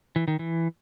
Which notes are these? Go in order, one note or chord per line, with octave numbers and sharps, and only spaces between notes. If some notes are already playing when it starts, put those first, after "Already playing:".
E3
D#3
E3